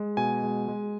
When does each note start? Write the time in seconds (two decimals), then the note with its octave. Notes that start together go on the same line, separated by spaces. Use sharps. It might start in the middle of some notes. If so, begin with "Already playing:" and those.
Already playing: G#3
0.17 B2 G#5
0.43 G#3
0.68 G#3